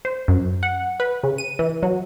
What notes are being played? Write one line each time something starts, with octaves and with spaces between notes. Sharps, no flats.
C5
F#2
F#5
B4
C#3
D#7
E3
F#3